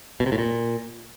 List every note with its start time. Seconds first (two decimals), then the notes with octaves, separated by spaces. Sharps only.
0.20 B2
0.26 C3
0.32 A2
0.38 A#2